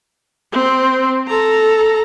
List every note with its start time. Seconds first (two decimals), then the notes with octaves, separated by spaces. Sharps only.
0.52 C4
1.28 A4 A#5